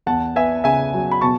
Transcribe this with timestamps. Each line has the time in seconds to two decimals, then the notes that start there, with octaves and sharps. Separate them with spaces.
0.07 E2 F#5 A5
0.36 B3 E5 G#5
0.64 C#3 E5 G#5
0.94 F#3
1.11 B5
1.21 B2 A5 C#6